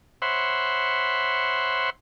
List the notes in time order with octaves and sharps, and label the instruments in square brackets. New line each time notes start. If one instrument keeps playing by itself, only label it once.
[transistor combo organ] C5 C#5 E5 F#5 B5 C6